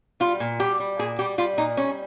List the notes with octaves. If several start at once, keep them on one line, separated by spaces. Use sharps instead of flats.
G3 F4
A#2
G3 G4
G3
A#2 G#4
G3 G4
G3 F4
A#2 D#4
G3 C#4